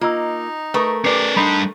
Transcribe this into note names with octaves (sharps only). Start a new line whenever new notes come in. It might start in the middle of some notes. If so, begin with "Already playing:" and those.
A#3 D#4 F4 D#5 E6
A3 A#4 B4 C#6 D#6
C#4 G4 B4 D5 C7
G3 D4 D#4 B5 C6 B6